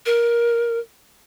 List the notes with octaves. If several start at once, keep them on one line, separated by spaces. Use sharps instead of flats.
A#4